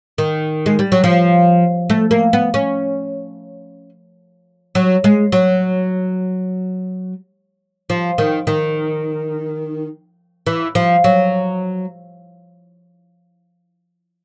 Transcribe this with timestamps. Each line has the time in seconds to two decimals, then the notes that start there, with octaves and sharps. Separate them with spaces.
0.18 D#3
0.66 G#3
0.79 G3
0.92 F#3
1.04 F3
1.90 A3
2.11 A#3
2.33 B3
2.54 C#4
4.75 F#3
5.04 G#3
5.32 F#3
7.90 F3
8.18 D#3
8.47 D#3
10.47 E3
10.75 F3
11.04 F#3